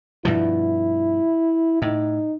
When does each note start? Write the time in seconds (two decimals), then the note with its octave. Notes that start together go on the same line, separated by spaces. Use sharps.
0.25 G2 B2 F3 E4
1.82 A2 D#4